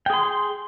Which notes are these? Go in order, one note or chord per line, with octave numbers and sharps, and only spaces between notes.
G#4 G5 C6